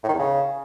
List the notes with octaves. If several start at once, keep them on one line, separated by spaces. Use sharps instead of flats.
A2
D#3
E2
C#3